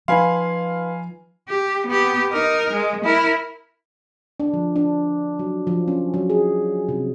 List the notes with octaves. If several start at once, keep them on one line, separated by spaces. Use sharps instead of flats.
F3 D#4 B4 F5 G#5 B5 C6
G4
B3 G4
D#4 A#4
G#3
E4 A#4
D4
F3
D4
F#3
F3
C#4
F#3
G#4
C3